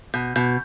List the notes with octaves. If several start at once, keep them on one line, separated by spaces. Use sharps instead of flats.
B2 G6
B2 G6